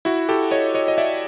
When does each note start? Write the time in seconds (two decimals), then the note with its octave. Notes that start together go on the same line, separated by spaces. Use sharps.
0.05 E4 F#4
0.29 G4 A4
0.51 C#5 D#5
0.75 C#5 D#5
0.88 D#5
0.98 D5 E5